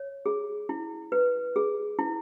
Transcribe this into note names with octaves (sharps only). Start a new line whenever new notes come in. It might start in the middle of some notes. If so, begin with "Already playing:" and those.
Already playing: C#5
G#4
E4
B4
G#4
E4